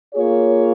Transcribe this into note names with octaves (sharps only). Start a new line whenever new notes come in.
A#3 F4 G#4 C#5